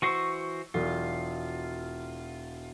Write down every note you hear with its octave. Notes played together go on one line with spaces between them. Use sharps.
E3 F#4 C5 C#6 E6
E1 F4